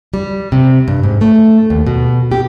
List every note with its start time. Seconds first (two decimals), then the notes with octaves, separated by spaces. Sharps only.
0.14 G3
0.52 C3
0.88 G2
1.03 G#2
1.21 A3
1.70 D#2
1.87 B2
2.32 G4